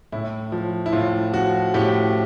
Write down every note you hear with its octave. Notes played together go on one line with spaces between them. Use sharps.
A2 E4
F3
E4
A2 F4
F3 F#4
A2 G4